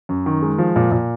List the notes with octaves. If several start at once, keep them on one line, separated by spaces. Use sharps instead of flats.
F#2
D#3
G#3
F3
A#2
A#2